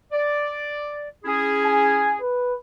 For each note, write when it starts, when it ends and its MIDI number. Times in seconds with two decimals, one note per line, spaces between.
0.12 1.09 74
1.25 2.18 61
1.25 2.18 64
1.25 2.18 68
1.65 2.12 80
2.21 2.54 71